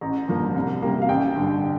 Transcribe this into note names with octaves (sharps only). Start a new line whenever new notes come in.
A1 A#5
G2 F3 A#3
C2
C3 G3 A#3
F5
A1 G5
G2 D3